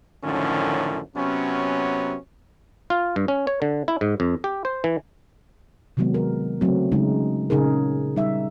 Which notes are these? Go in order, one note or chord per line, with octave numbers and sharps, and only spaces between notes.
F#2 A2 D3 D#3 F3 C#4
C3 F#3 B3 C#4
F4
G2
C#4
C#5
D3
E4
G#2
F2
G4
C5
E3
C3 D#3 F#3 G#3 B3
A#4
C#3 F#3 A3 C4
C#3 G#3 D#4
A#2 C#3 D#4 G#4 A#4
G3 D#4 E5